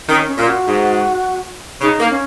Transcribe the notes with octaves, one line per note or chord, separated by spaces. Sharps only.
D#3 C#4
C#4
A#2
F#4
G#2
C#3 D#4
A#3
C#4